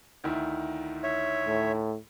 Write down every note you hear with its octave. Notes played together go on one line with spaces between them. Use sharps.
D2 D#3 E4
C#5 E5
A2